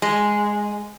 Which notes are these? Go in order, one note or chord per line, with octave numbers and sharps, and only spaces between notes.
G#3